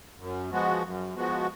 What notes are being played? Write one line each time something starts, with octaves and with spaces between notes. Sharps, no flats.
F#2
F3 G#3 B3 F#4
F#2
F3 G#3 B3 F#4